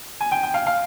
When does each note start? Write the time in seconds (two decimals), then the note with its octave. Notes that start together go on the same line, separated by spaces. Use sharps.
0.21 G#5
0.32 G5
0.43 G5
0.54 F5
0.67 F5